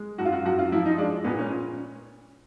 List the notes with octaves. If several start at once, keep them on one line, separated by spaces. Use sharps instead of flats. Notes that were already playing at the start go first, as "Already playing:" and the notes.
Already playing: G#3
F#2 F#4
F4
F#4
F#2 F#4
F4
F3 E4
D#4
G#3 D4
A#2 B3
C#4